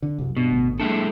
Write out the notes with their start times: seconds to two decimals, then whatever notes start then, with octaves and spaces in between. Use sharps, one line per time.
0.02 D3
0.18 C2 F#2
0.37 G2 B2
0.51 G1 A2
0.80 F#3 G#3 A#3 D4 E4 A4